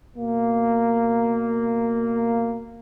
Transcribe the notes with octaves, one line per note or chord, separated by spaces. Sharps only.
B2 A#3